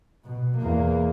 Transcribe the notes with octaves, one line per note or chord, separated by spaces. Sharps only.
B2
E2 A#3